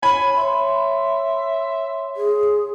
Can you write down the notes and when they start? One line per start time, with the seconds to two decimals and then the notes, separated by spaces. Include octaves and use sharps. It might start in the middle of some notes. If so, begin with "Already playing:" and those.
0.03 C#5 G#5 B5
0.37 C#5 E5 C6
2.17 G#4